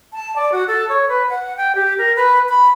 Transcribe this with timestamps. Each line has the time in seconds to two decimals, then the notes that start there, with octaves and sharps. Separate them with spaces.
0.13 A5
0.36 D5
0.52 F#4
0.68 A4
0.89 C#5
1.09 B4
1.30 F#5
1.57 G5
1.75 G4
1.98 A#4
2.16 B4
2.49 B5